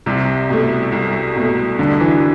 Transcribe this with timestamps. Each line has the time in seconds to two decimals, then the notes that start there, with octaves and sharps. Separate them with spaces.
0.06 C2 C3
0.50 B2 A3
0.92 C2
1.36 B2 A3
1.79 C2 D3
2.00 E3